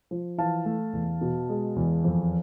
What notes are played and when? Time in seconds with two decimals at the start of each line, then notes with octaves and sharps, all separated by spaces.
0.11 F3
0.38 E3 F5 A5
0.65 A3
0.93 E2
1.21 B2
1.49 G#3
1.76 E2
2.04 F2